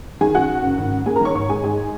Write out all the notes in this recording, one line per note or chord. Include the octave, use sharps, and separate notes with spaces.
D#3 G#4 G#5
F#2 F#4 F#5
F#2
F#1
G#1
F#2
A#3 G#4 G#5
A#4 A#5
D#3 C#5 C#6
G#1 C#5 C#6
G#2 G#4 G#5
G#2 G#4 G#5